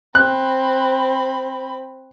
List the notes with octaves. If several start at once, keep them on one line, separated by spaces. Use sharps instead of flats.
C4 B5 F#6